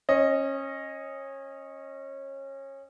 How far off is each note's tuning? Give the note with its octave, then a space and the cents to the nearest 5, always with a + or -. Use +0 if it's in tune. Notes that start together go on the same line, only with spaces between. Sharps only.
C#4 -25 D#5 +0